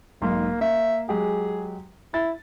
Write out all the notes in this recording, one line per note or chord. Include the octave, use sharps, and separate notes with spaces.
B1 G#2 A#3 C6
A#3 E5
F#3 G#3 G4 G#4
E4 A6